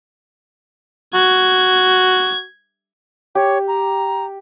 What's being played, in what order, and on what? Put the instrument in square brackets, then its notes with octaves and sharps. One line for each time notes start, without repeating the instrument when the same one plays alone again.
[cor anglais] F#4 [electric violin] G#6
[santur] G4 [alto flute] C#5
[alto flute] A#5